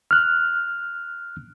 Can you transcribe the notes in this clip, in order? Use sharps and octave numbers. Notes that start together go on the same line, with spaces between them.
F6 F#6